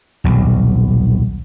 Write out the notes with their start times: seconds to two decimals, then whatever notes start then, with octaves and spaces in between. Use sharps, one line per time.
0.24 D#1 B1